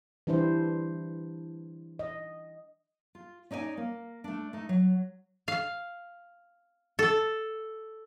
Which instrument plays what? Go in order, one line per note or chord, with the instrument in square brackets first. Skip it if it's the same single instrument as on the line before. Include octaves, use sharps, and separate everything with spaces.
[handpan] E3 G3 D4 E4 C5
D#5
[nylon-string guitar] F4
C#4 D#4 D5 D#5 G#5
A#3
A3 D4
A3 D#4
F#3
[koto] F5
A4